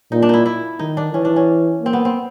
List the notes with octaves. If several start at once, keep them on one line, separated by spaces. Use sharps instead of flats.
A#2 D#4
D4
D#4 E4
E4
D#3 D#4
D4
E3 C#4
D4
C#4
A#3 C4
B3
C4